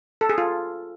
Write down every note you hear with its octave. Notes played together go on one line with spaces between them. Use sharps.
A4
G#4
F4